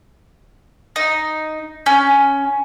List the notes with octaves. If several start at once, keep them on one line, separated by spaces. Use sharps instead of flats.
D#4
C#4